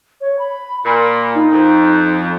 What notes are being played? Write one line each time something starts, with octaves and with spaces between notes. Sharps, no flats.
C#5
B5
A#2 B5
D#4
F2